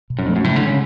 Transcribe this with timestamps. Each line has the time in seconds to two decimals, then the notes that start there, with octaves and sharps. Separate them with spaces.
0.10 B2
0.19 F#2
0.26 F2 A3 D4
0.36 F#2
0.44 A2 C#3
0.56 D3
0.62 C#3 G#3 C#4